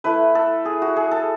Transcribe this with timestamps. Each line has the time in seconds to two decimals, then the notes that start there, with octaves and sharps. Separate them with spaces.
0.04 A3 E4 B4
0.35 A4
0.65 G#4
0.82 F#4
0.96 G#4
1.11 A4